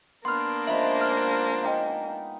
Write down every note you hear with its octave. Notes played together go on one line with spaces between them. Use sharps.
A#3 B3 D4 C6 F6
F3 G#3 C#4 C5 E5 B5
F6
D#4 F5 G5